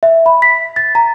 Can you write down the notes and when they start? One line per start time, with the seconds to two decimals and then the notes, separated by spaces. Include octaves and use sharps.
0.03 E5
0.26 B5
0.42 B6
0.76 A6
0.95 A#5